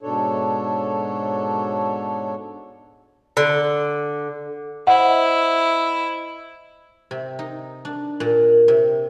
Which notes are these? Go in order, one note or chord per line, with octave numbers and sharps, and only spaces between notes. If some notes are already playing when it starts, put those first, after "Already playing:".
G#2 B2 D4 A4 C#5
D3
E4 C5 D#5 E5 F#5
C3
D#4
D4
A#2
C3